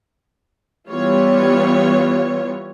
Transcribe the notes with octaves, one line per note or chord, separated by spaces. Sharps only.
E3 G3 B3 F4 C#5